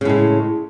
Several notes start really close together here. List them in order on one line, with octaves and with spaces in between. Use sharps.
C#3 A2 G#3